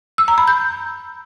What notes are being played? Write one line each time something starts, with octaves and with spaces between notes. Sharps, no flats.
E6
A#5
B5
G6